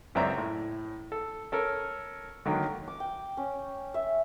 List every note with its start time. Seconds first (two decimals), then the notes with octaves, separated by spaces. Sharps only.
0.15 C#2 F#2 C4 D5 E5 A#5
0.38 A2
1.12 A4
1.52 C#4 A4 A#4
2.46 D3 D#3 F#3 A#3
2.88 D6
3.00 G5
3.37 C#4
3.94 E5